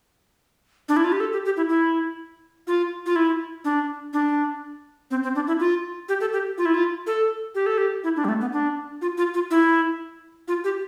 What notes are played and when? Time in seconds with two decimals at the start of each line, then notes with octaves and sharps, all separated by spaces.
0.89 D4
0.97 E4
1.04 F4
1.12 G4
1.20 A4
1.33 G4
1.45 G4
1.57 E4
1.69 E4
2.67 F4
3.06 F4
3.16 E4
3.65 D4
4.13 D4
5.11 C4
5.23 C4
5.35 D4
5.47 E4
5.60 F4
6.09 G4
6.21 A4
6.33 G4
6.58 F4
6.66 E4
6.74 F4
7.07 A4
7.55 G4
7.66 A4
7.78 G4
8.04 E4
8.16 D4
8.25 G3
8.28 A3
8.41 B3
8.53 D4
9.02 F4
9.18 F4
9.34 F4
9.51 E4
10.48 F4
10.64 G4